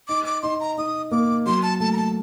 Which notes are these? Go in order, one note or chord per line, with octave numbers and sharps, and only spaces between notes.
D#4 D6
D6
D#4 C6
A#5
D#4 D#6
A#3 D6
F#3 C6
A5
A3 A5
A#5
A5